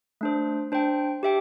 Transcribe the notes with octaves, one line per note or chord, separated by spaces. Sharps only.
A3 D4 C5
D4 C5 G5
G4 E5 G5